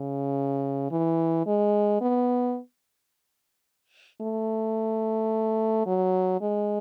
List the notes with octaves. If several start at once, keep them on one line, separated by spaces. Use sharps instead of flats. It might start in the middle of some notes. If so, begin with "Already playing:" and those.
Already playing: C#3
E3
G#3
B3
A3
F#3
G#3